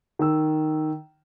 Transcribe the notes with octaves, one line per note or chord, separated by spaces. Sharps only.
D#3 E6